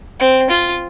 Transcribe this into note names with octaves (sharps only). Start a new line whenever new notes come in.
C4
F4